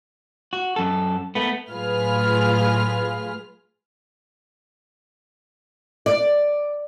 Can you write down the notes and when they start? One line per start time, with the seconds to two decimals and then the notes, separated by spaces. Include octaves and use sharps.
0.53 F#4
0.76 F#2 A4
1.35 A3 B3
1.70 A2 F#3 F4 G#4 B4 F6
6.06 D5